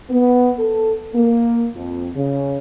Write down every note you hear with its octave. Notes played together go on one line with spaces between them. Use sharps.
B3
A4
A#3
F2
C#3